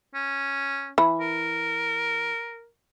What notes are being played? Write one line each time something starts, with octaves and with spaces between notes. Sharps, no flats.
C#4
E3 B5
A#4